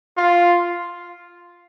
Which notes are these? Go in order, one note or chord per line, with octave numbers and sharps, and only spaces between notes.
F4